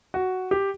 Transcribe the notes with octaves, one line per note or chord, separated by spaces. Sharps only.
F#4
G4